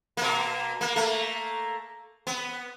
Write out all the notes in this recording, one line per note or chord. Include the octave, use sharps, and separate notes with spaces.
B2 A#3
A#3
A3 A#3
B3